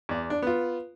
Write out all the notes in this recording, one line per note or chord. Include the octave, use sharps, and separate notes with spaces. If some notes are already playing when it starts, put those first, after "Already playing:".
E2 D5
D4
B3 F4